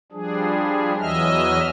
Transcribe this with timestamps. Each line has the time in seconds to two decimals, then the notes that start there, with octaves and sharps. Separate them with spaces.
0.12 F3 G3 D4 G#4
0.99 E2 E3 F#3 D#5 E5 F6